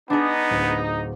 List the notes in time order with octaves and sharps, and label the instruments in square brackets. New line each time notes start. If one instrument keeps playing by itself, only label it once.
[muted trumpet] B3 [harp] D4 G#4 [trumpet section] D#4
[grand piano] D1